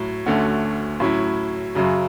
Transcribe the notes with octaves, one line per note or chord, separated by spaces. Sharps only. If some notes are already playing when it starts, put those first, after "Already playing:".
Already playing: A2 F#3
D2 D3 A3 C#4 F#4
A2 F#3 C#4 E4
F#2 C#3 F#3